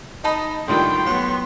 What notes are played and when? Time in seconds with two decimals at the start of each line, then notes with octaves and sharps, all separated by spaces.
0.24 D#4 D#5 A5 B5
0.68 A2 D3 D#3 G3 F4 G5 C6
1.06 F#3 B3